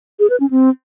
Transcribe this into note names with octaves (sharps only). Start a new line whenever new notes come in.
G#4
B4
C#4
C4